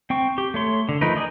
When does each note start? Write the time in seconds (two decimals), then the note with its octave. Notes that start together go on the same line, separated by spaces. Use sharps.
0.10 C4 G5 C#6
0.38 G4
0.54 A3 C#5 C6
0.89 D3
1.01 F3 A3 D#4 A#4 B4
1.16 G#4 D5 D#5